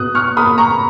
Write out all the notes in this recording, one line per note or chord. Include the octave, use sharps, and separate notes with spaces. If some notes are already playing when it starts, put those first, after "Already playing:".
Already playing: B2 D#6 F#6
C#6 F6
A#3 B5 D#6
A#5 C#6